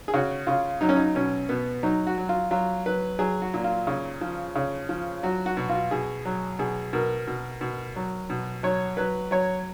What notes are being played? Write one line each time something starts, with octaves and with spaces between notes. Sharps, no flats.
G#4
C#3 F#4
C#3 F4
F#3 D#4
C#4
D#4
B2 C#4
B2 B3
F#3 D#4
F#4
F#3
F4
F#3 F4
F#3 B4
F#3 G#4
F#4
A#2
F4
C#3
F3
C#3
F3
F#3 F#4
F#4
B2
F4
B2 G#4
F#3
B2 G#4
B2 A#4
B2
B2
F#3
B2
F#3 C#5
F#3 B4
F#3 C#5